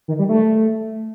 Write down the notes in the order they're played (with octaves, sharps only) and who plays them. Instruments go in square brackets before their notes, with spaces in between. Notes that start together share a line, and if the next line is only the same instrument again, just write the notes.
[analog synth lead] D#3
G3
A3